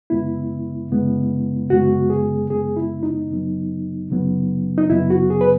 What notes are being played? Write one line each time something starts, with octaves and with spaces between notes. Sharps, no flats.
F#2 C#3 G#3 B3 E4
F#2 C#3 G#3 B3
F#2 C#3 G#3 B3 F#4
G#4
F#2 C#3 G#3 B3 G#4
E4
D#4
F#2 C#3 F#3 B3
F#2 C#3 F#3 B3
D#4
F#2 C#3 F#3 B3 E4
F#4
G#4
B4